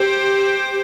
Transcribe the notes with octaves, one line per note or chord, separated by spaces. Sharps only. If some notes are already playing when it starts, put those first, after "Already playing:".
Already playing: G4 C5